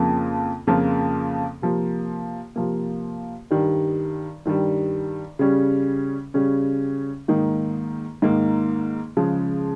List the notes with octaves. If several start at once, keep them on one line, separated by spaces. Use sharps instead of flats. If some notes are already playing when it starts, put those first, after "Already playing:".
Already playing: F2 C#3 F3 A#3 F4
F2 C#3 F3 A#3 F4
C3 F3 A#3
C3 F3 A#3
G2 D#3 G3
G2 D#3 G3
C#3 G3 C#4
C#3 G3 C#4
G#2 D#3 A#3 D#4
G#2 D#3 A#3 D#4
C#3 F3 G#3